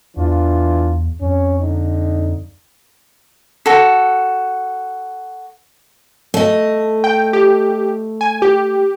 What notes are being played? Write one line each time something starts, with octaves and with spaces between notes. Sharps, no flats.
E2 E3 D4 F4
F2 C#4
D3 D#4
F#4 A4
A3 D#5
G5
G4
G#5
G4